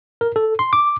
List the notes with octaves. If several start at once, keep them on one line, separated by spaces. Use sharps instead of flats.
A#4
A4
C6
D6